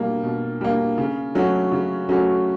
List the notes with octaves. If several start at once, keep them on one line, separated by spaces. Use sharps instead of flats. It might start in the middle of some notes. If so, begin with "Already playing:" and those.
Already playing: B2 G3 A#3
B2
G3 A#3
C#3
F#3 A3 C#4 F#4
C#3
F#3 A3 C#4 F#4